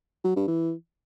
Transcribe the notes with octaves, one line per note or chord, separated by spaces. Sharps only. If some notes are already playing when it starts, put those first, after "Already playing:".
F#3
G2
E3